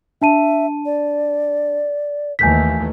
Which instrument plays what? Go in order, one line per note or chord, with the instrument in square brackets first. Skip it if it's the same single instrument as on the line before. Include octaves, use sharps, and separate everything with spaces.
[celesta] D4 A5 D#7 [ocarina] E5
[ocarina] D5
[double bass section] D#2 E3 A3 [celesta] G#5 G6 B6